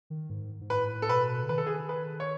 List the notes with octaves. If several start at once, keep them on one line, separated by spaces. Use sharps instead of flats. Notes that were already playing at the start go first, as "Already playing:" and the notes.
D#3
G#2
G#2
A2 B4
A4
B2 B4
C#3
D#3 B4
A4
G#4
A4
B4
C#5